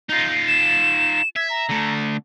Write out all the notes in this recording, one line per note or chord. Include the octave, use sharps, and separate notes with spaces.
D#4 F4 G6
E7
E5 G#6
A#5
D3 A3